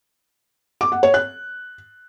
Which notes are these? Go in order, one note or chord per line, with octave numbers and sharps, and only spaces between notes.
D6
F#5
C#5
F#6